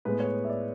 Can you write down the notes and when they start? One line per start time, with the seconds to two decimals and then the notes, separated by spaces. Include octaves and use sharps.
0.05 A2 G#3 B3 B4
0.20 C#5
0.44 E5
0.49 D5